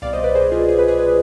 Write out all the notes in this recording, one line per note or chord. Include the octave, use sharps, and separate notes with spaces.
C2 B2 G3 D5 F5
C5 D#5
B4 D5
G#4 C5
F4 G#4
G#4
B4
G#4
B4